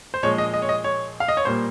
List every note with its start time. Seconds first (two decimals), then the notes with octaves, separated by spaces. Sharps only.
0.14 C5
0.23 A#2 F3 G#3 C#5
0.38 D#5
0.54 D#5
0.62 C#5
0.69 D#5
0.84 C#5
1.20 F5
1.28 D#5
1.37 C#5
1.45 A#2 G3 A#3 C5